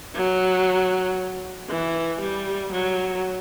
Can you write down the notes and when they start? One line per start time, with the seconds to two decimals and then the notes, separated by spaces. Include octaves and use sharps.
0.15 F#3
1.69 E3
2.21 G3
2.72 F#3